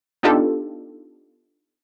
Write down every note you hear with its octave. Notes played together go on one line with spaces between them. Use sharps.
B3 D4 D#4 F4 G4 A4